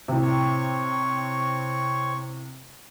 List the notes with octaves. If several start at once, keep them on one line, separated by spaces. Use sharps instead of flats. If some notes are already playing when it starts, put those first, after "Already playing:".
A2 C3
C4 C#5 C#6